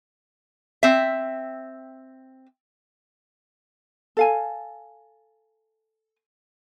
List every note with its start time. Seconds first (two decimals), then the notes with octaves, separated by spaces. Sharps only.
0.83 C4 E5
4.17 A4 F5 G#5